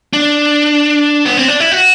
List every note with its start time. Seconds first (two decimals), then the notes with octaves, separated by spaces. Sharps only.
0.13 D4
1.25 B3
1.37 C4
1.48 D4
1.60 E4
1.72 F#4